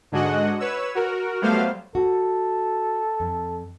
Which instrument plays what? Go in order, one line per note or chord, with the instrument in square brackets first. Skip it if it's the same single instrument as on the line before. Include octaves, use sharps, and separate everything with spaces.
[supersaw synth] G#2 D3 G#3 F#4 D#5 F#5
B4 C#5 E6
F#4 A#4
F#3 G3 A3 B3 C5 F5
[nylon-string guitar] F#4 [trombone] A4
[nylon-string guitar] F2